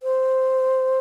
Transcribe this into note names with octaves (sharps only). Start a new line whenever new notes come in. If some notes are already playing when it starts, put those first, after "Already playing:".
C5